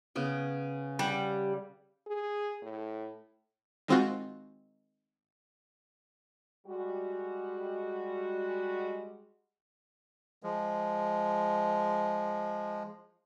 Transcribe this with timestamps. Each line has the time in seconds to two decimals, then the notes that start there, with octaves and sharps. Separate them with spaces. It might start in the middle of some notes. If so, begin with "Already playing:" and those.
0.16 C#3 B3
0.99 G3 F#5
2.07 G#4
2.62 A2
3.88 D#3 G#3 C4 F4 F#4
6.67 G3 G#3 F#4
10.43 F3 G#3